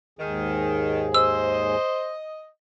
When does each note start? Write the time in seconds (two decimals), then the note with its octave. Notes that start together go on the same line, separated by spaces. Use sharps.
0.19 D#2 G#2 D#3 G#4
1.14 C5 D#5 E6